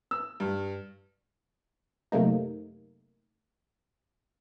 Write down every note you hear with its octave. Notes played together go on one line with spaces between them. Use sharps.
E6
G2
F#2 C3 A3 A#3 D#4